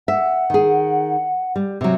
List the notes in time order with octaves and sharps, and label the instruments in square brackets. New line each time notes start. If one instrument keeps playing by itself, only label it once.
[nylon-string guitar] E5 [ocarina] F#5
[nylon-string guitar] D#3 G#4
G3
C3 F#3